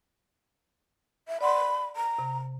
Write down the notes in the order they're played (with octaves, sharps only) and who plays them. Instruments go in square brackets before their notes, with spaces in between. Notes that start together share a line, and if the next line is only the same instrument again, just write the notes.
[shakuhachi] E5
[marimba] D5 F#5 C6 [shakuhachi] B5
[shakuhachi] A#5
[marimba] C3